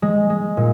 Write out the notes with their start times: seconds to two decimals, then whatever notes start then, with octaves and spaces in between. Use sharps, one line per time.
0.02 G#3
0.30 G#3
0.57 A#2